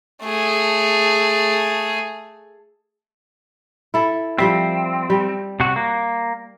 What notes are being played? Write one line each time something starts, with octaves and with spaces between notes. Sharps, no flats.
A3 G#4
E4 A4
F3 G3 C4 E5
G3
C3 F#4
A#3